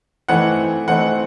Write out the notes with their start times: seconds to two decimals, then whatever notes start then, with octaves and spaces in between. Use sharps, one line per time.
0.29 E3 A3 C4 D#4 F#5
0.88 E3 A3 C4 D#4 F#5